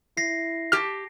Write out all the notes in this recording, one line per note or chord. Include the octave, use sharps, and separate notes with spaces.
E4 A#6 C7
G4 A5 F6